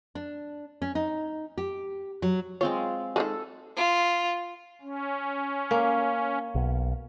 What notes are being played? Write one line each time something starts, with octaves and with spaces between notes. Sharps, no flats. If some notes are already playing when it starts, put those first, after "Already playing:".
D4
C#4
D#4
G4
F#3
G#3 C4 F4 C#5
D#3 E3 G#3 A4
F4
C#4
A#3
B1